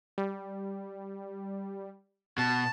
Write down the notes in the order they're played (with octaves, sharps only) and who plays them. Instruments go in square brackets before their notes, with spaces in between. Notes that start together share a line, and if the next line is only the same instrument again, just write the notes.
[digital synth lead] G3
[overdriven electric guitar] B2 [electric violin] A5